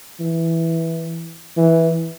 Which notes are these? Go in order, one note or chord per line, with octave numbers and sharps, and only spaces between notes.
E3
E3